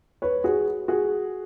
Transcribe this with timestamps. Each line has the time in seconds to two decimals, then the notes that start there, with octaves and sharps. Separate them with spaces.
0.22 B4 C#5
0.44 F#4 G#4
0.88 F#4 G#4